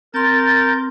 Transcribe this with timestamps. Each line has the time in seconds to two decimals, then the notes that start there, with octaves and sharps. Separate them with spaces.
0.14 C4 A#4 C6 G6 A6